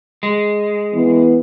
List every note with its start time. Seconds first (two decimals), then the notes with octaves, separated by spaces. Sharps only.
0.23 G#3
0.94 E3 B3